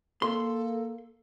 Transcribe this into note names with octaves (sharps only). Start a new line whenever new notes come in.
A#3 A4 C6